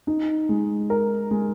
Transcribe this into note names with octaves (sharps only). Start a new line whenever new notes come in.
D#4
G#3
A#4
G#3